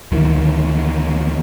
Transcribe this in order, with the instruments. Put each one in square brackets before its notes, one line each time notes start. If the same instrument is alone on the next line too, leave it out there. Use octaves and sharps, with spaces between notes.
[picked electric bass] D2 D#3 E3